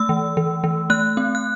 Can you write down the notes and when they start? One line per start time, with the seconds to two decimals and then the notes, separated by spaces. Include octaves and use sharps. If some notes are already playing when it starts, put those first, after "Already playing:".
Already playing: A3 E6
0.09 E3
0.37 E3
0.64 E3
0.90 A3 F#6
1.17 C4
1.35 F#6